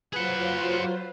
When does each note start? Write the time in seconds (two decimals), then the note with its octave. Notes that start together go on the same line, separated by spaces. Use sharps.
0.13 F#3 F4 G#4 B4 C5 F#5